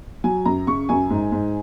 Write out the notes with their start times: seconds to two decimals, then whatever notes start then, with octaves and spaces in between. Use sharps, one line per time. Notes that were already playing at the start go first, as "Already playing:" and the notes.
0.24 F#3 G#5
0.45 F#2 A#5
0.67 C#3 C#6
0.89 F#2 G#5
1.10 G#2
1.32 G#2